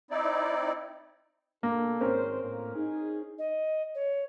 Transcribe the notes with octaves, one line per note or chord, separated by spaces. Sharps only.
C4 D#4 E4 D5
B2 A#3 D4 A4
G#1 C4 C#4 A#4 C5
A2 A#3
D#4 G#4
D#5
C#5